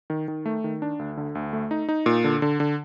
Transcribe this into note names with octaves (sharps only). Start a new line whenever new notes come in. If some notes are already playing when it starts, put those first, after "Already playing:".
D#3
D#3
A3
D#3
D4
D2
D3
D2
A3
D#4
D#4
A#2
D3
D3
D3